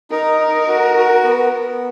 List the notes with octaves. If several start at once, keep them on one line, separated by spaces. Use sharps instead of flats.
D#4 A#4
D#4
F#4
F#4
B3
B3